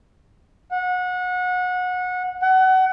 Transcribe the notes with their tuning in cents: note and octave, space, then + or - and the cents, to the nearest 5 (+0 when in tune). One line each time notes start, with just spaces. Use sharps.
F#5 -25
F#5 +30